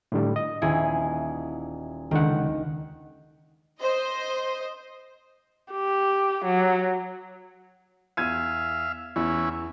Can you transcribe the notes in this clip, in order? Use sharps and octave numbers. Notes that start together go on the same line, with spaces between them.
A2 D3 G3
D#5
D#1 E4 G#4
C#2 D3 D#3 F#5
C5 D#5
G4
F#3
E2 E5 F5 G#6 D#7
E2 E3 C#4 E4